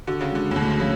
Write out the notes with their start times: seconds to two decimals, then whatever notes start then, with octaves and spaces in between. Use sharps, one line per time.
0.07 D3 F#4
0.21 C#3
0.32 D3 G#3
0.51 A2
0.56 D2 B2
0.80 C#3 F#3